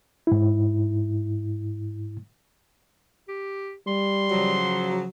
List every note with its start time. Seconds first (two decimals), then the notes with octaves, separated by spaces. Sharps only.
0.27 G#2 E4
3.28 G4
3.87 G3 C6
4.31 C#3 F3 F#3